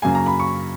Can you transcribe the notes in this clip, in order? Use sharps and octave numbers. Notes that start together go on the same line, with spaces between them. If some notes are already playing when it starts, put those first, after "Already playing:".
F#2 C#3 F#3 A#3 G#5
A#5
B5
C#6